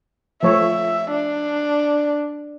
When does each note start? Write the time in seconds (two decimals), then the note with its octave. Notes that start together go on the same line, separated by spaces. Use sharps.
0.43 F3 A3 C#5 E5
1.11 D4